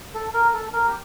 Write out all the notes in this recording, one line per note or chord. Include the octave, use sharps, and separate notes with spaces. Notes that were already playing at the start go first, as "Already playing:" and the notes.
A4
A#4
A4
A#4
G4